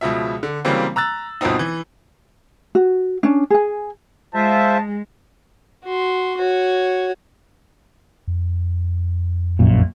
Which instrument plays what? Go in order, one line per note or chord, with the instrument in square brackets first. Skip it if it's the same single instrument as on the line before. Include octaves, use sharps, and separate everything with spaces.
[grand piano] C#2 B2 F3 E5
D3
C#3 E3 F#3 G3 A#3 C4
A#5 E6 F#6 A6
G1 B2 F3 B3 C4 D#4
E3
[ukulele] F#4
C#4 D4
G#4 G#5
[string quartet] G#3 [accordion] F4 C5 E5 [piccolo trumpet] A5
[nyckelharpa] F#4 C6
F#4 C#5
[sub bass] F2
[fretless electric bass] A#1 F#2 A#2